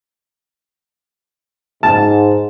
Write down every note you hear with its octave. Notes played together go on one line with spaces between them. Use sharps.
G#2 A5